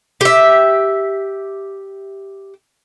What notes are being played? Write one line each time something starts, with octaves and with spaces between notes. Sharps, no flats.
G4 E5